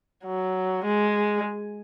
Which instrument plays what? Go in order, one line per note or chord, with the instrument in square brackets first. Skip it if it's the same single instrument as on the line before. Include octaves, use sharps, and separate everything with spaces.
[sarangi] F#3
G#3